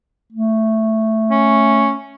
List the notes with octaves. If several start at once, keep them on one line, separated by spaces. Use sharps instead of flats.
A3
C#4